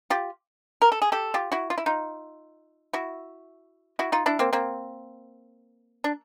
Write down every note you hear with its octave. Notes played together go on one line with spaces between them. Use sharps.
F4 G4
A#4
A4
G#4
G4 A4
F4 G4
E4 F#4
F4
E4
D#4 F4
E4 F#4
E4 F#4
D#4 F4
D4 E4
A#3 C4
A#3 C4
D4